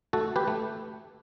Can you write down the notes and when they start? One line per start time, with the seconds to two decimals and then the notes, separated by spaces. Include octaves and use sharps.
0.13 A3 F#4 A4
0.36 G4 B4
0.48 A3